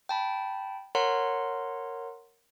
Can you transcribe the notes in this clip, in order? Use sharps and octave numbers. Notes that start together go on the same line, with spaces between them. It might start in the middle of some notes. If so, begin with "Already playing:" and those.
G5 A5 B5
A#4 C#5 F#5 A#5 C6